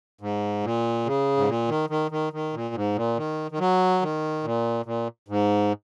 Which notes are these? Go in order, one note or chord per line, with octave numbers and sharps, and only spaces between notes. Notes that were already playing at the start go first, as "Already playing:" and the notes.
G#2
A#2
C#3
G#2
A#2
D#3
D#3
D#3
D#3
A#2
G#2
A#2
D#3
D#3
F#3
D#3
A#2
A#2
G#2